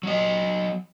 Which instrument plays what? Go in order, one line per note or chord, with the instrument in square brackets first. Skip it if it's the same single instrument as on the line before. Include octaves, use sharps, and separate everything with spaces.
[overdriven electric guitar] F#3 D#5